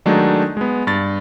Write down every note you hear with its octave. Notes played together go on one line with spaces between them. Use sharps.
D#3 F#3 G#3 A3 D4 D#4
G#3 B3
G2 A6